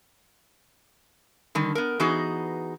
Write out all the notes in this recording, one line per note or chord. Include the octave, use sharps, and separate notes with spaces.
D3 D#3 G3
B3 A#4
E3 B3 D#4 F#4 G#4